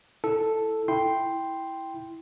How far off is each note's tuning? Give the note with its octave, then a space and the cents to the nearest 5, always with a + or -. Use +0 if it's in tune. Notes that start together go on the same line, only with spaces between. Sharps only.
E4 +0 A4 +0
E4 +0 G5 +0 C6 +0